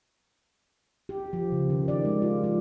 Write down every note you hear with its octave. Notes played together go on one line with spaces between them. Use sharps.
G4
F3
C#3
D#3
D5
G#3
F4
F3